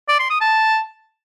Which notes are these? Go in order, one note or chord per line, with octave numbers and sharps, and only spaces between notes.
D5
C6
D#6
A5